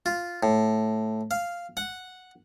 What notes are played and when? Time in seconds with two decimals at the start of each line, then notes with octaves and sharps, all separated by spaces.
0.06 F4
0.43 A2
1.31 F5
1.77 F#5